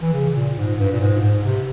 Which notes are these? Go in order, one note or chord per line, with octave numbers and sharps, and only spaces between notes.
E3
C#3
A#2
G#2
G2
A#2
G#2
G#2
C3